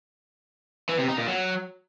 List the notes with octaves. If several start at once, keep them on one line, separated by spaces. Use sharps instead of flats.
E3
C3
D#4
A#2
F#3